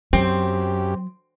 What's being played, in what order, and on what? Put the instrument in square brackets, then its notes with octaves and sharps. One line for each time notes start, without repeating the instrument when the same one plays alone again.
[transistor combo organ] F#2 G4 [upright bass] F#3 [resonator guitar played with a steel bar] C4